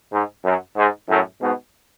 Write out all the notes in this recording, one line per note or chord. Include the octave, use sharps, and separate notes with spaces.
G#2
F#2
G#2
F#2 A2
G#2 B2